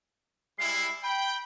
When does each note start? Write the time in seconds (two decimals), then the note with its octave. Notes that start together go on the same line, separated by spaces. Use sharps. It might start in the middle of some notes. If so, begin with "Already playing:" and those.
0.59 G3 G#3 E4 C7
1.03 G5 B5